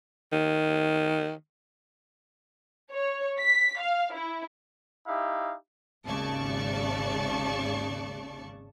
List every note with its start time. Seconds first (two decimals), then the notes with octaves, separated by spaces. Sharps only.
0.32 D#3
2.92 C#5
3.39 B6
3.80 F5
4.14 E4
5.07 D#4 E4 G4 F5
6.04 G#1 D#2 C#3 D5 A5 C#6